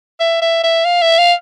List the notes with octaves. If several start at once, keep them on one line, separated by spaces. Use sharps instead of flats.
E5
E5
E5
F5
E5
F5